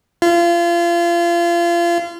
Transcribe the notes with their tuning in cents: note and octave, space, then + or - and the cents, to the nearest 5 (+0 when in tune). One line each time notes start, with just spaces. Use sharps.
F4 -30